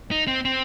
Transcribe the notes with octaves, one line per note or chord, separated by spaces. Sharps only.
D#4
C4
C4